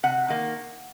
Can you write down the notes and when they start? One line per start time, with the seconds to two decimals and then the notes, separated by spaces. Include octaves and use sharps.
0.03 C3 F#5
0.28 D#3 A#3